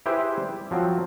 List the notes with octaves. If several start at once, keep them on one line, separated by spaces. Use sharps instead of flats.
E4 G4 G#4 B4 C5 E5
G3
F3 F#3 C4